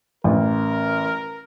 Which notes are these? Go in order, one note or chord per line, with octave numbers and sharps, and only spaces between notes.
A1 A#4